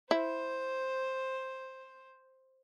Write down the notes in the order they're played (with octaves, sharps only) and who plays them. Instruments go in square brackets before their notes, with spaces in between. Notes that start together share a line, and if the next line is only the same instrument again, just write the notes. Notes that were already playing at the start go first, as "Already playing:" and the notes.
[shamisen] E4 [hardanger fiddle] C5